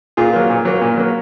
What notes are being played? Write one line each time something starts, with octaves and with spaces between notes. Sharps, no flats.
A#2 F4 G#4
F#3 A#3
A#2
F#3 A#3
A#2
F#3 A#3